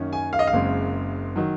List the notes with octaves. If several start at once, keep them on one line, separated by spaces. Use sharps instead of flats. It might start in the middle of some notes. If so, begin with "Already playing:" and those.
Already playing: F#2 D#3 A#3 C#4
G#5
F5
D#5
F5
F#1 F#2 C#3 G#3 C4
D#3 F#3